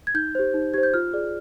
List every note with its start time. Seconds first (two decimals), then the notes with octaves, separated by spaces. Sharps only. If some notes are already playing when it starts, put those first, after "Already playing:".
0.07 G#6
0.15 D#4 G6
0.35 G4 C5
0.54 D#4
0.74 G4 C5 G#6
0.83 G6
0.94 F4 F6
1.13 G#4 D5